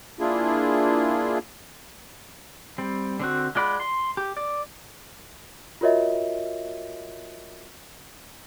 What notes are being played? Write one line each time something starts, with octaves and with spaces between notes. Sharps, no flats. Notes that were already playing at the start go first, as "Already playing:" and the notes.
A#3 D4 E4 F4 G#4
G3 C4
D3 C4 F#4
G#3 F4 D5 F#5 B5
C6
G4
D5
F4 F#4 A#4 C#5 D#5 E5